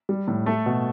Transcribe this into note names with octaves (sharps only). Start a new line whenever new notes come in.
G3
A2
A3 A4
B2